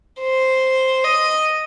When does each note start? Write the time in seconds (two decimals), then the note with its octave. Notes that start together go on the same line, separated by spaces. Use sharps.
0.21 C5
1.04 D#5